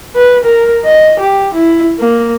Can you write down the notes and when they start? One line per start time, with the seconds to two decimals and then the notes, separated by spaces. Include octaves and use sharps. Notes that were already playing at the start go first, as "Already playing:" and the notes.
0.16 B4
0.44 A#4
0.85 D#5
1.20 G4
1.54 E4
2.00 A#3